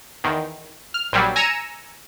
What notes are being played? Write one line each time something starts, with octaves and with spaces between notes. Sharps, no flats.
E2 D#3
F6
A#1 F#3 G3
G#5 A#5 E6 C#7 D#7